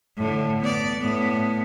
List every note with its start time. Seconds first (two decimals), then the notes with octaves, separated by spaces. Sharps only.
0.18 A2 D3
0.60 B3 D5
1.00 A2 B3